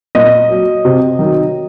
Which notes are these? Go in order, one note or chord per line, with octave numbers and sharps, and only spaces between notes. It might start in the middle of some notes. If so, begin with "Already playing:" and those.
A#2 D#5
F#3
C3
D#3 F#3